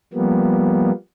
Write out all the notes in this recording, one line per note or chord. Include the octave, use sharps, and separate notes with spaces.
F3 G3 A#3 B3